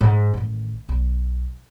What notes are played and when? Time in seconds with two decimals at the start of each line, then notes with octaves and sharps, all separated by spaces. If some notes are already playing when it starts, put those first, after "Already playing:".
0.01 G#2
0.34 A1 D#3
0.89 B1